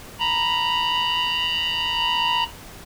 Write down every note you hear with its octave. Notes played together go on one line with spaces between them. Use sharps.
A#5 B5